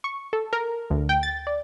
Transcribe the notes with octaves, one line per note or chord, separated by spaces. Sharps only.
C#6
A4
A#4
D2
G5
A6
D5